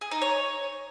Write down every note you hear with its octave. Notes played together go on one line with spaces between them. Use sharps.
G#4
D#4
C#5